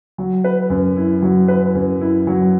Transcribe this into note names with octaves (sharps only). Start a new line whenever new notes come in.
F#3
B4
F#2
E4
F#3
B4
F#2
E4
F#3